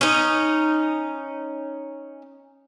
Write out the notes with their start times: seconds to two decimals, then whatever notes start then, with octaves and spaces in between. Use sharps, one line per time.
0.01 C#4 D#4